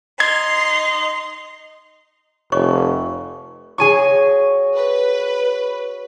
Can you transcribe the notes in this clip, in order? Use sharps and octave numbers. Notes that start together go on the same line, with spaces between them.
D#4 C6 G#6
F1 C#5 D#5 C#6
F#4 G#4 C#5 G#5 C#6
B4